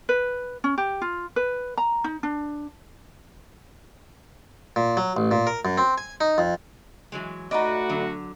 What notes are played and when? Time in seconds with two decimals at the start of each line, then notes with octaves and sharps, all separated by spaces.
0.09 B4
0.64 C#4
0.78 G4
1.02 F4
1.36 B4
1.77 A#5
2.04 D#4
2.23 D4
4.76 A#2
4.97 F#3
5.17 A1
5.31 A#2
5.47 A#4
5.65 F#2
5.78 C4
5.98 G#5
6.21 D#4
6.38 F2
7.12 E3 F#3 G#3
7.51 A3 D#4 F#4 B4 D5 D#5
7.89 D3 F#3